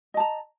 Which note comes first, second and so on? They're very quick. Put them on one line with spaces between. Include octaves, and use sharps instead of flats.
D#5 A5 A#5